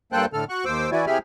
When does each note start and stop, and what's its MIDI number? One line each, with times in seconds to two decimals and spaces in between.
0.13 0.26 43
0.13 0.26 58
0.13 0.26 69
0.13 0.26 72
0.13 0.26 79
0.13 0.26 90
0.33 0.44 45
0.33 0.44 50
0.33 0.44 69
0.33 0.44 89
0.49 0.65 66
0.49 0.65 85
0.49 0.65 90
0.65 0.90 39
0.65 0.90 72
0.65 0.90 86
0.65 0.90 88
0.92 1.05 52
0.92 1.05 64
0.92 1.05 66
0.92 1.05 74
0.92 1.05 80
1.07 1.18 48
1.07 1.18 64
1.07 1.18 67
1.07 1.18 68
1.07 1.18 83
1.07 1.18 89